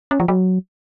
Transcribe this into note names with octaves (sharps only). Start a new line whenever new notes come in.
C#4
F3
F#3